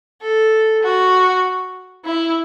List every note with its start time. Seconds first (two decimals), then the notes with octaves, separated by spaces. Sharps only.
0.21 A4
0.83 F#4
2.05 E4